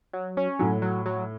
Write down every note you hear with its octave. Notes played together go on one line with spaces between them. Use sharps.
F#3
C#4
A2 F#3
F#3
F#3